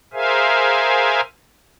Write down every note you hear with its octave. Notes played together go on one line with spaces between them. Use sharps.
G#4 A#4 C5 E5 F5 G#5